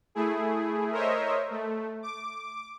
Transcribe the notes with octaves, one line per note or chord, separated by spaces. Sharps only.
A3 E4 G#4
A#4 C5 C#5 D#5 E5
A3
D6